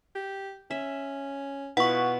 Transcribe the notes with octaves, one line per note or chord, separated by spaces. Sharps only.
G4
C#4 E5
B2 E4 F4 F#5 C#6